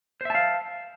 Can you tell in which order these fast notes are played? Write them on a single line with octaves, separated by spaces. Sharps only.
C5 E5 A5 F5